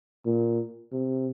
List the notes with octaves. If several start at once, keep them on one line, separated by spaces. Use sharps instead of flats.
A#2
C3